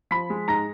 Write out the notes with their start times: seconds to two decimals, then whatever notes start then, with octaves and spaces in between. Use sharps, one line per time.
0.11 F3 B5 B6
0.30 G#3
0.48 G#2 A#5 A#6